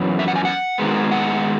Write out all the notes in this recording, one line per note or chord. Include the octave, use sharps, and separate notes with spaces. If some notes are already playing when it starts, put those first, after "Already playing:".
Already playing: F#2 E3 B3
E5
F#5
G#5
F#5
G#2 D#3 G#3 B3
F#5